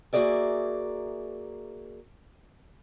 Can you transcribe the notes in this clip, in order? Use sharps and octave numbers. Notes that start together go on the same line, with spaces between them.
A#3 F#4 G#4 D5 E5